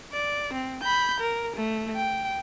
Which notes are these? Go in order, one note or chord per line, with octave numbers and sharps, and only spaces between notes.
D5
C4
B5 G6
A#4
A3
G5